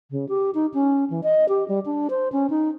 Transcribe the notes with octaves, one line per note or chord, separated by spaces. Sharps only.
C#3
G4
D#4
C#4
E3
D#5
G4
G3
D4
C5
C#4
D#4